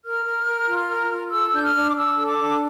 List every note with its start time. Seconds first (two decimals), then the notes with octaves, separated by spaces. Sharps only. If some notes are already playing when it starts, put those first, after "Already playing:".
0.03 A#4 F6
0.24 A#4
0.45 A#4
0.67 F4
0.88 A#4
1.09 F4
1.30 A4 E6
1.51 D4 G6
1.63 F6
1.73 D4
1.89 D6
1.94 D4 E6
2.15 A4
2.26 D6
2.37 D4